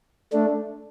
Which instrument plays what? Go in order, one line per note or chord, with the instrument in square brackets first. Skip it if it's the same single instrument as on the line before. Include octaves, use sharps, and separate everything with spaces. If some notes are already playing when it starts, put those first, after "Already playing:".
[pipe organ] A3 D4